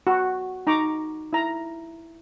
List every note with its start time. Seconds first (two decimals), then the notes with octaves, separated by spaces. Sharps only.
0.07 F#4
0.67 D#4 A#5 C#6 D6
1.33 E4 A#5